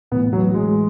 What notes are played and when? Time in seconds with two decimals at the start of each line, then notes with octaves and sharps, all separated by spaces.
0.11 A2 B3
0.16 E3
0.33 F#3
0.54 G#3